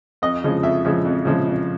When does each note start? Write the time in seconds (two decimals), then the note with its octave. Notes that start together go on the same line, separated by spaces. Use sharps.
0.22 F2 D#5
0.44 C#3 F3 G#3
0.63 F2 E5
0.85 C#3 F3 G#3
1.05 F2
1.25 C#3 F3 G#3
1.47 F2